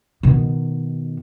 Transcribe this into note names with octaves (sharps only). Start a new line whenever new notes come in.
B2 D#3